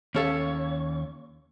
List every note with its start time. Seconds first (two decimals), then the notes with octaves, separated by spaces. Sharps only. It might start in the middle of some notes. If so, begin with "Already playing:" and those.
0.15 D#2 C#4 A4 C#5 F5